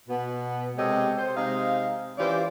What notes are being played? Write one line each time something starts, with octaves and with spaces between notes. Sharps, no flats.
B2 B3
C3 G#3 G4 A4 C#5 D#5
C5
C3 G#3 D#4 D#5 F5
E3 C#4 F4 G4 C5 D5